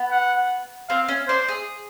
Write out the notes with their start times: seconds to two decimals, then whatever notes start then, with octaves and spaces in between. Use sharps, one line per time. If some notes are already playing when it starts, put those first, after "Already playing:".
Already playing: B3
0.11 F#5
0.89 C4 F5
1.08 C#4
1.28 D4 C5
1.48 G#4